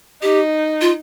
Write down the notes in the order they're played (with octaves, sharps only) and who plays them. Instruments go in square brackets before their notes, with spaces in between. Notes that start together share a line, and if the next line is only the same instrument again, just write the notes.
[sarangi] D#4 [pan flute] G4
[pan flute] F4